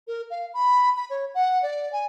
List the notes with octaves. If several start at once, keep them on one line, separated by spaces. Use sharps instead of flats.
A#4
F5
B5
B5
C#5
F#5
D5
G#5